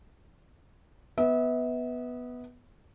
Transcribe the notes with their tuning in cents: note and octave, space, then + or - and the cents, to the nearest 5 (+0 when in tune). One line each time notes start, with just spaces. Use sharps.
B3 +0 E5 -35